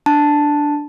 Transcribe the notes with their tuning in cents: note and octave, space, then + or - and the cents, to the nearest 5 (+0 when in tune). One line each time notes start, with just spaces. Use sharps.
D4 +0 A5 +0